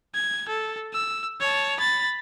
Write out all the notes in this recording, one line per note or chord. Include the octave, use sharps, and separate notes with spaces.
G#6
A4
E6
C#5 A5
B5 A6